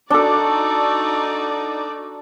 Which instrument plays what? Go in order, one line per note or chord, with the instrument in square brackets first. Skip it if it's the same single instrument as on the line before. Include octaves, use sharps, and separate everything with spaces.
[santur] D4 A4 [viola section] D#4 F#4 D5